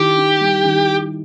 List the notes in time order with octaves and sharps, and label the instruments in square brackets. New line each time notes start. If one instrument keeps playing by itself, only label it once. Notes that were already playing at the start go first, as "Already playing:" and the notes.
Already playing: [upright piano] D#3 E4 [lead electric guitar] G4
[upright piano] D#4
G3
D#3